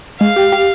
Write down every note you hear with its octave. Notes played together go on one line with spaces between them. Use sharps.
G#3 F5
G4
G4